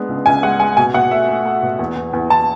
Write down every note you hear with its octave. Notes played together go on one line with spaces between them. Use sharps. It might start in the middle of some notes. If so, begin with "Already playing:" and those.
Already playing: G#3 B3 D4
C#2
C#2 G#5
G#3 F#5
G#3 G#5
B2 G#5
B2 F#5
A3 E5
A3
A3
B2
E2
E2
E2
E2 A5